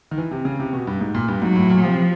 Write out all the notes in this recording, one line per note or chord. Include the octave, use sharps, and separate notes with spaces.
D#3
E3
C3
C#3
C3
B2
G2
G#2
A#2
G2
G#2 F#3
A2
A#2
C3 F3